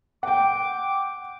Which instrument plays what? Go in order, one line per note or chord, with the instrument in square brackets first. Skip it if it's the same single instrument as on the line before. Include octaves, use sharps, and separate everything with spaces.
[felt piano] F#5 G5 [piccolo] D6